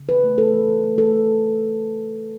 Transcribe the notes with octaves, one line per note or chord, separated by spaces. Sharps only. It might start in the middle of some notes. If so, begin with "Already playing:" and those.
Already playing: C#3
E3 B4
A3
A3 A4
E3
E3
A3
A3 A4